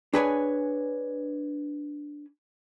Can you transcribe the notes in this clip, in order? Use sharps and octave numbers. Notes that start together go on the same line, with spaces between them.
D4 G#4 B4 C#5 G5 G#5